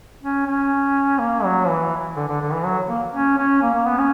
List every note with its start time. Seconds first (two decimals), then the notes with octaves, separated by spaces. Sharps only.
0.22 C#4
0.46 C#4
1.19 A#3
1.44 F#3
1.68 E3
2.16 D3
2.28 D3
2.41 D3
2.53 E3
2.65 F#3
2.89 A#3
3.14 C#4
3.37 C#4
3.62 A#3
3.74 A#3
3.87 B3
3.98 C#4